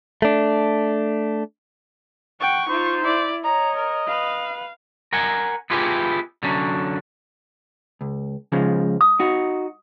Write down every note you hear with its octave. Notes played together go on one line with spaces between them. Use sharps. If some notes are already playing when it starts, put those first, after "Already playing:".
A3 D4
F#5 G5 C#6
D#4 F4 C5
E4 D5
C#5 D#5 A#5
A#4
B4 F5
A#4 F#5 G#5
B3 E4 F4 G4 G#4 B4
D3 F#3 C#4
C#2
C#3 F3 G#3
D#6
D#4 F#4